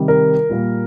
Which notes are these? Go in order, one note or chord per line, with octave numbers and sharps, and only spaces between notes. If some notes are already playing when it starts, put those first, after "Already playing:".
Already playing: C3 D#3 G3
A#4
A#2 G3 A#3